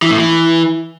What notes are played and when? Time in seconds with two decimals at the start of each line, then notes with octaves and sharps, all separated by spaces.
0.02 E3
0.10 A2
0.18 E3